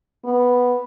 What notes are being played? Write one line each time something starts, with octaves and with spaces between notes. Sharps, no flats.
B3